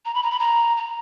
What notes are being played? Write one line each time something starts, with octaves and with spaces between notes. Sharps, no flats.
A#5
B5
A#5
B5
A#5
A#5